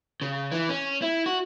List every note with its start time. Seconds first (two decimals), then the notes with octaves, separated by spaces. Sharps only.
0.21 C#3
0.52 E3
0.69 C#4
1.02 E4
1.26 F#4